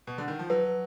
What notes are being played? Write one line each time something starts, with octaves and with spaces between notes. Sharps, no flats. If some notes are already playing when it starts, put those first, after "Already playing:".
B2
D3
D#3
F3
F#3 B4